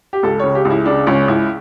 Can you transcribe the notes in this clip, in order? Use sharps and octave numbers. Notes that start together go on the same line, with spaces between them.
G4
C#2 A4
C#3 C#5
G4
C#2
E4
C#3 D4
C#2 C#4
C#2 E4